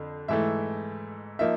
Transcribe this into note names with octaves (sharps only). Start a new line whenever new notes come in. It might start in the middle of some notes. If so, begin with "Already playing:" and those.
Already playing: F2 D3
G#2 E3 A3 E5
F3 A#3 D#4 E5